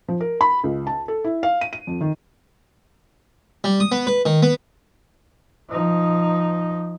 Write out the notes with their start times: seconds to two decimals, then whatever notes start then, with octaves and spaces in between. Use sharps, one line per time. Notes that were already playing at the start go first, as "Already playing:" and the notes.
0.08 F3
0.20 A#4
0.41 B5
0.64 C#2
0.87 A5
1.08 A4
1.24 E4
1.43 F5
1.61 D#7
1.73 D#7
1.87 F2
2.01 D#3
3.64 G3
3.80 D#6
3.92 B3
4.07 B4
4.26 D#3
4.42 B3
5.70 F3 D#4